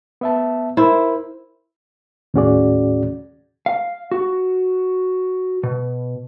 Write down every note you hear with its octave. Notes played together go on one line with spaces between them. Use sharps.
B3 E5 A5
E4 A#4 C5
D#2 A2 C#4 F#4 G#4 D5
F5
F#4
B2